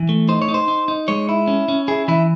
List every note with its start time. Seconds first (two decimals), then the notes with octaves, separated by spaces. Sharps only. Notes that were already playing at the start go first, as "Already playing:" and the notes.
Already playing: E3
0.09 A3
0.28 D#4 C5
0.42 C#5
0.48 D#4
0.54 C5
0.68 D#4
0.88 D#4
1.08 G#3 C#5
1.29 E4
1.47 C#4
1.68 C#4
1.88 E4 G#4
2.08 E3 E4